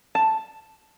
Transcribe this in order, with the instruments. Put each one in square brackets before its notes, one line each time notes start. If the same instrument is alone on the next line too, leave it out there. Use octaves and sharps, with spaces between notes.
[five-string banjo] A5